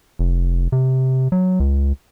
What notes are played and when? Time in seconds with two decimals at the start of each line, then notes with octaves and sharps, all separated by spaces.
0.19 F1
0.72 C3
1.32 F#3
1.60 C#2